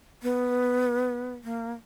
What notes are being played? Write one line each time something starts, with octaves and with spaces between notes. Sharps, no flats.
B3
A#3